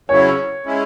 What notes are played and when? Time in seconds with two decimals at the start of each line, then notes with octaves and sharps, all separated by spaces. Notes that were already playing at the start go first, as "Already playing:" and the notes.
0.09 C#3 F#3 C#4 E4 C#5
0.66 G#3 C#4 E4